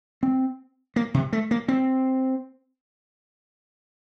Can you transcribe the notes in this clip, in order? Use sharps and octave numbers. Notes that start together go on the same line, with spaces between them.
C4
A#3
C3
A3
A#3
C4